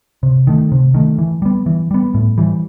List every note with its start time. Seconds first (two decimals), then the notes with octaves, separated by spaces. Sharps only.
0.23 C3
0.47 D#3 A3
0.72 C3
0.94 D#3 A3
1.18 E3
1.42 G3 B3
1.66 E3
1.91 G3 B3
2.14 A2
2.38 E3 G3